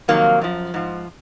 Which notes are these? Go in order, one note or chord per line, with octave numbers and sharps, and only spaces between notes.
F2 C3 D#3 F#3 A#3
F#2 F3
G#2 F3